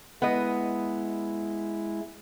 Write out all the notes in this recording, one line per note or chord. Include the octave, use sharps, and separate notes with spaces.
G#3 B3 E4 D#5